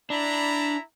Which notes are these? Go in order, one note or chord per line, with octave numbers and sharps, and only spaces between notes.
D4 E4 A#5 B5